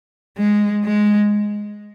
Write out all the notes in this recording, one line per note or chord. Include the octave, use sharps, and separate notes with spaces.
G#3
G#3